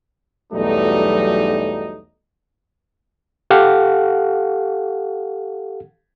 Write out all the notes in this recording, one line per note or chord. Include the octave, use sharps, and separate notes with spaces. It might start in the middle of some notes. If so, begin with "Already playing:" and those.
B1 E2 F#3 G3 A3 D#4
G4 A4 F5 F#5